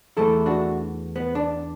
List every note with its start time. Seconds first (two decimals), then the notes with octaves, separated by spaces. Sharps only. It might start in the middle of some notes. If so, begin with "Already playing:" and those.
0.17 E2 E3 A3 E4 A4
0.46 D4 F#4
1.16 B3
1.35 D4